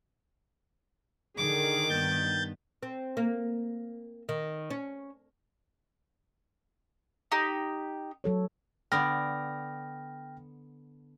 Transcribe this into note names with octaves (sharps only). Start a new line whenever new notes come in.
D3 D#3 G#4 D6
G2 B3 G6 A6
C4
A#3
D#3
C#4
D#4 G4
F#3 A4 C#5
D3 B3 D5 G5 F6 A#6